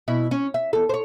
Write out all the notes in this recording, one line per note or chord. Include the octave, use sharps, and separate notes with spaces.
B2 E4
C#4
E5
E2 A4
C5 C#5